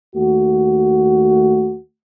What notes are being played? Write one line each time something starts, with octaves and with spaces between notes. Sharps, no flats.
D#2 A3 F#4